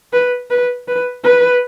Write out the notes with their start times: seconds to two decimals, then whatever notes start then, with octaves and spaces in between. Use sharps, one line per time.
0.13 B4
0.50 B4
0.88 B4
1.24 B4